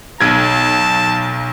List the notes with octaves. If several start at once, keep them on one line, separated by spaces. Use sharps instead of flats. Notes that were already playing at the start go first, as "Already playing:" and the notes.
B1 A5 G#6